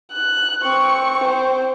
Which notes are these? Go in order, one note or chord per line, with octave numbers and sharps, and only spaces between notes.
F#6
C4 C#6
C4 C5